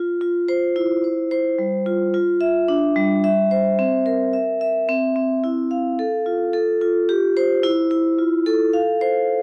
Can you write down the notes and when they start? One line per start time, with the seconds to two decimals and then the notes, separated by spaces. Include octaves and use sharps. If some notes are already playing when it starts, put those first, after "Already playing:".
Already playing: F4
0.21 F4
0.48 C5
0.76 E4
1.04 C5
1.31 C5
1.59 G3
1.86 F4
2.14 F4
2.41 E5
2.68 D4
2.96 G3
3.24 E5
3.51 C5
3.79 C4
4.06 A#4
4.33 E5
4.61 E5
4.89 C4
5.16 C4
5.44 E4
5.71 F5
5.99 A4
6.26 F4
6.53 A4
6.81 F4
7.09 G4
7.37 C5
7.63 E4
7.91 E4
8.19 F4
8.46 A4
8.73 F5
9.01 C5